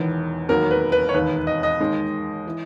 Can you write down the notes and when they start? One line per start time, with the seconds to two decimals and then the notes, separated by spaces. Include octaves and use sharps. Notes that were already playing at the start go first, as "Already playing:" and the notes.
Already playing: E1 E2 D#3
0.49 E1 D#2 D#3 F#3 A#3 A#4
0.71 B4
0.92 B4
1.09 C#5
1.14 E1 D#2 D#3 B4
1.47 D#5
1.63 D#5
1.80 D#2 D#3 G#3
2.47 E3